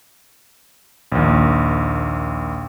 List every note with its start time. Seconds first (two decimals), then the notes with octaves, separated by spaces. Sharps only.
1.12 A#1 D#2